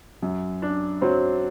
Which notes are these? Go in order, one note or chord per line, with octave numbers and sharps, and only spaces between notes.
F#2 F#3
D4
F#2 F#3 C4